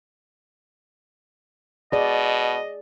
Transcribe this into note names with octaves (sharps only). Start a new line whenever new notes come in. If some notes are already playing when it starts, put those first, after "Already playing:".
B2 G#4 D5 D#5